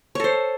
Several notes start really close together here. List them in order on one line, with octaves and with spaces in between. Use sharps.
C#5 A4 C5